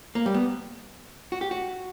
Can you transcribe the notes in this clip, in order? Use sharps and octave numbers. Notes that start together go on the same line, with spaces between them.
A#3
G3
B3
F#4
G4
F#4